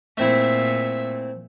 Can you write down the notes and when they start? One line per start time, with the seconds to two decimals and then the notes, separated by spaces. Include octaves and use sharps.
0.17 A#2 A3 C4 E4 E5